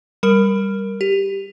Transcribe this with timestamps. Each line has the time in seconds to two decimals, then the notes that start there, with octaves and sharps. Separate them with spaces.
0.23 G3 A#4
1.01 G4